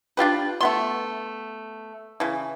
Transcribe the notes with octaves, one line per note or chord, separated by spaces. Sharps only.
D4 F4 G4 B4
A3 B3 C6
C#3 E3